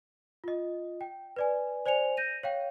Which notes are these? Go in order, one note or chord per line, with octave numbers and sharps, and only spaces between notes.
F4 D#5
G5
B4 D5 G#5
C5 D5 G#5 C#7 F7
G6 A#6 D#7
C#5 F5 G5